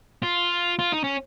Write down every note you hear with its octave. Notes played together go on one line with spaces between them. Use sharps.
F4
F4
D#4
C#4